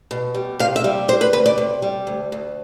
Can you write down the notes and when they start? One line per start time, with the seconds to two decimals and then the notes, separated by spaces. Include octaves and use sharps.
0.11 B2
0.35 G3
0.59 C3 F5
0.76 E5
0.84 G3
1.08 D2 C5
1.21 B4
1.33 D2 B4
1.46 D5
1.58 C3
1.82 G3
2.07 D2
2.32 D2